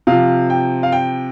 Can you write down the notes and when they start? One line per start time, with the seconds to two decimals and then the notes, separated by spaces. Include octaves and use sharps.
0.07 C3 F3 F5
0.50 G5
0.83 F5
0.92 G5